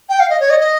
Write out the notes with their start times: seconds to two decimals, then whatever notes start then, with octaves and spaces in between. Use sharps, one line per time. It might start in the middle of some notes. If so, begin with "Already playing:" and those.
0.09 G5
0.19 F5
0.29 D#5
0.40 C#5
0.49 D#5
0.60 D#5